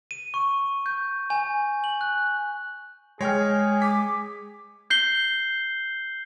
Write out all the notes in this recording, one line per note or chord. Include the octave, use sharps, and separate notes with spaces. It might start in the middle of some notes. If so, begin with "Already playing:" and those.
D#7
C#6
G6
G#5
F#7
F#6
G#3 G#4 C#5 G5 F6
D6 B6
G6 C7 G7